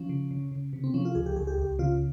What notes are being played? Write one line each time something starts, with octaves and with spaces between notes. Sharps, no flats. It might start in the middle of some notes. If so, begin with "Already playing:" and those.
Already playing: F3 C#4
C#3
C#3
C#3
C3
C4
F3 C#4
F4
C#2 G#4
G4
C#2 G#4
G4
C#2 G4
C#3 F4